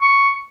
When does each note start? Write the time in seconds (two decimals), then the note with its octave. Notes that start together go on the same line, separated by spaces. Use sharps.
0.02 C#6